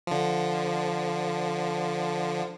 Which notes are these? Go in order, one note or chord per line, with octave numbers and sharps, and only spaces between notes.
D3 F3